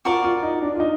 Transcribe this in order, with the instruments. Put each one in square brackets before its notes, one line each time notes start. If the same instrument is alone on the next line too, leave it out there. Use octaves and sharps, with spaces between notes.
[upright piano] F4 [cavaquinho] F#4 A#4 D5
[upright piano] F4
D#4
D4
F4
D#4